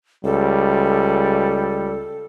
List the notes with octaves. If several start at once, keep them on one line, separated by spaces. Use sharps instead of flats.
C#2 G3 A4